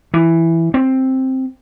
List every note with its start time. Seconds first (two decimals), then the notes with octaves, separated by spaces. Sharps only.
0.14 E3
0.74 C4